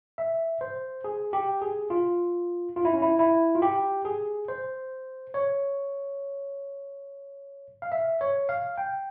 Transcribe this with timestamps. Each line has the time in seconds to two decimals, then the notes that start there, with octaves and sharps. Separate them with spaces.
0.18 E5
0.61 C5
1.04 G#4
1.33 G4
1.62 G#4
1.90 F4
2.76 F4
2.85 E4
2.94 C#4
3.02 E4
3.19 E4
3.55 F4
3.62 G4
4.05 G#4
4.48 C5
5.34 C#5
7.82 F5
7.92 E5
8.21 C#5
8.49 F5
8.78 G5